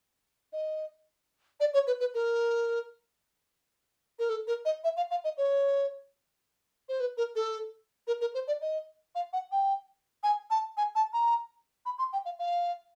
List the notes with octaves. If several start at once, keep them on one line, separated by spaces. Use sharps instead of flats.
D#5
D5
C#5
B4
B4
A#4
A#4
A4
A#4
D#5
E5
F5
F5
D#5
C#5
C5
B4
A#4
A4
A#4
A#4
C5
D5
D#5
F5
F#5
G5
G#5
A5
G#5
A5
A#5
B5
C6
G5
F5
F5